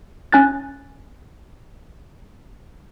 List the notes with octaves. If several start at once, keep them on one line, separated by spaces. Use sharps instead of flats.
C#4 G#5 F#6 A6